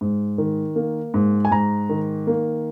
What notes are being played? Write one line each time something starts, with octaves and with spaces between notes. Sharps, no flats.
G#2
D#3
A#3
G#2
G#5
G#2 A#5
D#3
A#3